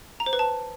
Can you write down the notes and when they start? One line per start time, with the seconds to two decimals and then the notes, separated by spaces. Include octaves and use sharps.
0.20 A#5
0.26 C5
0.33 B4
0.39 A5